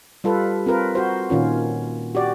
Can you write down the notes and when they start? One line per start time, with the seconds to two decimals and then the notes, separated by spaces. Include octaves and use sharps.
0.24 G3 F4 A4 B4
0.66 C4 F4 A#4 B4
0.95 F#4 C5
1.30 A#2 D#3 C#4 F4
2.15 F#4 G4 D5